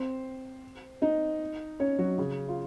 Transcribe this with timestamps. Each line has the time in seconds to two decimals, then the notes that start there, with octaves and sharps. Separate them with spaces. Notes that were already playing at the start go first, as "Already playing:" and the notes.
Already playing: C4 C5
1.02 D#4 D#5
1.80 C#4 C#5
1.99 F#3 F#4
2.18 C#3 C#4
2.48 F4